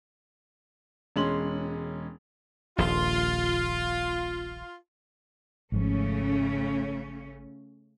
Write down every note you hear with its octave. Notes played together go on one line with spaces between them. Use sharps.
E1 G#3 C#4 C6 F#7
D#1 A#1 F4
G#1 G#2 C#3 F3 A3 C#4